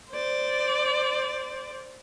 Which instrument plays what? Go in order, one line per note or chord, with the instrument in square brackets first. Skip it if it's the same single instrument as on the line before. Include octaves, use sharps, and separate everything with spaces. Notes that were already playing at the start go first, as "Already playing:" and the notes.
[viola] C5 D5